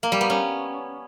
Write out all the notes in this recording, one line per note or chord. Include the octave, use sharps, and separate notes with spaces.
A#3
G3
B3
C#4